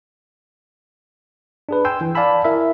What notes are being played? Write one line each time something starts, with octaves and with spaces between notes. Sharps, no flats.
D4 G#4 B4
G5 G#5 C6 E6 G6
E3
D5 F5 G#5 A5 B5 E6
E4 A#4 E5